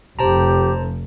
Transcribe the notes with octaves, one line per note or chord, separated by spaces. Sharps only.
F1 G4 C5 A5 A#5